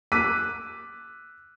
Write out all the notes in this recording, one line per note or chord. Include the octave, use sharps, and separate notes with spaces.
D6 E6 F#6 B6 D#7